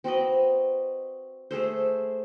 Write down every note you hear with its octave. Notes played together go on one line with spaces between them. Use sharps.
C4 F#4 B4 D#5
A3 G#4 A4 C5